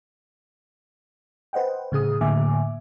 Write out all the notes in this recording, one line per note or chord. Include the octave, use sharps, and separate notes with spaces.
B4 C5 D#5 F#5 G5
A2 C#3 G#4 D#6
A2 D3 A#3 E5 G#5 D6